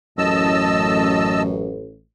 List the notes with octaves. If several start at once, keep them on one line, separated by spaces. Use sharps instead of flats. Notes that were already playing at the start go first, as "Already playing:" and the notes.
A1 F#2 D#5 A5 E6